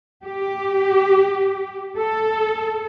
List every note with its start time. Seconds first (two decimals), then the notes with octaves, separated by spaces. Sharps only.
0.25 G4
1.97 A4